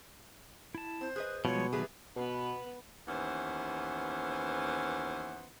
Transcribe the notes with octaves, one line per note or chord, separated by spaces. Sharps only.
E4 A5
C4 C5
G#4 B4 D#5 F#6
B2 F3 G3 G#3 F4 C#5
D#3 F#3 G3 A3 B3 G#4 B4
B2 B3 B4
D#2 E3 B3 C#4 C5